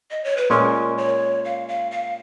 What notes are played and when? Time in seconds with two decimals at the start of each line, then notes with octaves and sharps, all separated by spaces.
0.11 D#5
0.24 C#5
0.37 B4
0.50 A#2 G#3 C#4 A#4
0.98 C#5
1.45 F5
1.68 F5
1.91 F5